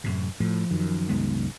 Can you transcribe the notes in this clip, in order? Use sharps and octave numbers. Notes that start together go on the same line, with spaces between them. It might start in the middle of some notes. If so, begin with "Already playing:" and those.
F#2 A2 C3
A2 F3
F#2 D#3
C2 G#3 B3